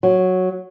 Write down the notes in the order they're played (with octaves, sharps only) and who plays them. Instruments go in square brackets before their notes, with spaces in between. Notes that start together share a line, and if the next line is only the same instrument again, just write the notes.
[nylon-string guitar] F#3